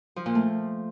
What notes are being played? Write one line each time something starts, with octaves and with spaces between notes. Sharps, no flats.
F3
A#2
A3